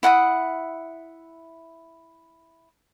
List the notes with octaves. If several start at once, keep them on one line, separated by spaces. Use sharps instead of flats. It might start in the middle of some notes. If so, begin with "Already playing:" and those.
E4 F#5 A5 D#6